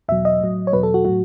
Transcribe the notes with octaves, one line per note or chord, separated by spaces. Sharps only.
E2 B2 F#3 E5
D#5
A2 F#3
C#5
E2 B2 F#3 B4
A4
F#4
A2 F#3 F#4